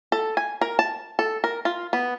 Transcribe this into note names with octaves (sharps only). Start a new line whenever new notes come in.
A4
G#5
A#4
A5
A4
A#4
F4
B3